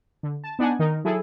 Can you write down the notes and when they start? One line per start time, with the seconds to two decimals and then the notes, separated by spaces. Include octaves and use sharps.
0.23 D3
0.44 A5
0.59 B3 D4 D#4 F#5 G#5
0.79 D#3 D#4 A#4
1.04 F#3 E4 G#4 A4